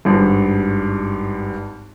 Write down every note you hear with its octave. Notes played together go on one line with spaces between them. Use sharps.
G#1 G2